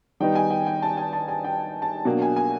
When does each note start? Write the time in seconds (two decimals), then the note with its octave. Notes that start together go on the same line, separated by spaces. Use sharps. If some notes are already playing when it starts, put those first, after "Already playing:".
0.20 D#3 G3 B3 D#4 G5
0.35 G#5
0.50 G5
0.66 G5
0.82 A5
0.97 G#5
1.13 A5
1.28 G#5
1.44 G5
1.82 A5
2.05 B2 F#3 A#3 D4
2.22 G#5
2.36 G#5